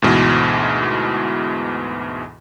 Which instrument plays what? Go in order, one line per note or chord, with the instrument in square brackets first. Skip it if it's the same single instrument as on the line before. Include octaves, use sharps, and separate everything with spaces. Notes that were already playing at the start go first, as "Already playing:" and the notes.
[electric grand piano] D2 G#2 B2 E3